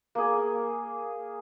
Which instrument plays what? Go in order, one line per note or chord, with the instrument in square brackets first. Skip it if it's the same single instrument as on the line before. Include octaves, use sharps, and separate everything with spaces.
[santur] A#3 G#4